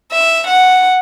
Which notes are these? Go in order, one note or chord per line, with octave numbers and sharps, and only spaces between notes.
E5
F#5